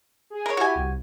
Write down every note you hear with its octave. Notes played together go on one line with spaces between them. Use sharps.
G#4
A#4 C#5
E4 F#4 G4 G#5
C2